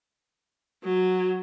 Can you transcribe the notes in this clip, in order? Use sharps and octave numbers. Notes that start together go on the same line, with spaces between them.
F#3